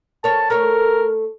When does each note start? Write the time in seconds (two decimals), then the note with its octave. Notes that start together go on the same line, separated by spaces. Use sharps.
0.24 A#4 C#5 A5
0.50 A3 A#4 C#5